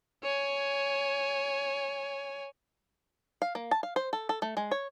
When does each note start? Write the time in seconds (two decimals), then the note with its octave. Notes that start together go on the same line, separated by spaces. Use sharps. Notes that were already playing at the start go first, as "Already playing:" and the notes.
0.23 C#5 G#5
3.42 F5
3.55 A#3
3.71 A5
3.83 F5
3.96 C5
4.13 A4
4.29 A4
4.42 A3
4.57 G#3
4.71 C#5